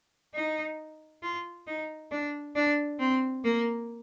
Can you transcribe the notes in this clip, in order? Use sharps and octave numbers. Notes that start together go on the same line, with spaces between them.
D#4
F4
D#4
D4
D4
C4
A#3